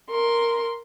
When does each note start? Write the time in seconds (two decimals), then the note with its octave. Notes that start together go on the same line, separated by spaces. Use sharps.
0.11 A#4 C6